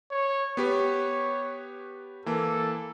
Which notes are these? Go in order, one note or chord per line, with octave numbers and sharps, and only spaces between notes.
C#5
B3 G4 B4 C#5
E3 A#3 A4